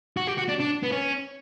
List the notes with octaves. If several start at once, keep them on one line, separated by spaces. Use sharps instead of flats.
F#4
G4
F#4
D4
D4
B3
C#4